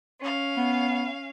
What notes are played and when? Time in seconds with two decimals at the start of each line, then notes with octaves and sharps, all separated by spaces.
0.20 C#4 F5
0.57 B3